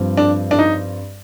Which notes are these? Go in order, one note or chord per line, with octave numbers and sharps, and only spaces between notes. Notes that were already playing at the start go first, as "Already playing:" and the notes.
Already playing: G2 F3 C4
D4
D4
D#4